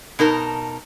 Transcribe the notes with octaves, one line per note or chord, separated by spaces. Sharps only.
B2 D#4 A#4 A5